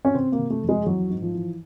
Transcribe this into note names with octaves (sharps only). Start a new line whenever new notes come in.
C#4
C3 C4
A#3
C3
A3
F2
G#3
E3 F#3
G#2
F3
E3